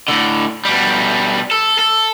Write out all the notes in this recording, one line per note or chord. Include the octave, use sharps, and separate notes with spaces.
A2 D3
B2 G3
A4
A4